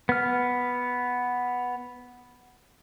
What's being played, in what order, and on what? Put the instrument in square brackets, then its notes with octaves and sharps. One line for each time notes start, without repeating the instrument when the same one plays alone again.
[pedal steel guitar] B3 F6